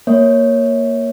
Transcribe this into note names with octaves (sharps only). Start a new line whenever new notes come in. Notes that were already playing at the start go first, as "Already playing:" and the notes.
A#3 C#5